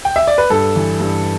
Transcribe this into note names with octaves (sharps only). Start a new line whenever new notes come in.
G5
E5
D5
B4
G2 A4
E3
G2